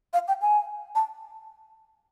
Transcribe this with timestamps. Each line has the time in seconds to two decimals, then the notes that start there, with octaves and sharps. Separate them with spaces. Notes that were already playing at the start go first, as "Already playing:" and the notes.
0.13 F5
0.28 G5
0.42 G#5
0.95 A5